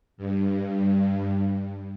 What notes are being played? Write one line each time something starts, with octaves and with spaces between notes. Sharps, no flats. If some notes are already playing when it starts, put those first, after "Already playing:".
G2
G2